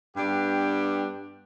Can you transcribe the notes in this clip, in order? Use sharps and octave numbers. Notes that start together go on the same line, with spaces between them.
G2 B3 D4 G4